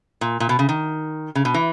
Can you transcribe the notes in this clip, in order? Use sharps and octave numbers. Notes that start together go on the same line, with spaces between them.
A#2
A#2
B2
C#3
D#3
C#3
B2
E3